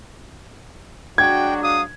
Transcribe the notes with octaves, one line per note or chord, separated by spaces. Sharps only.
F#3 G#3 D4 F#4 G5 G#6
F5 D#6